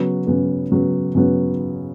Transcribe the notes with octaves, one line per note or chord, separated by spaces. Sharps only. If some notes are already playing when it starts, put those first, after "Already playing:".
Already playing: C#3 F#3 B3
C#3 F#3 B3
C#3 F#3 B3
C#3 F#3 B3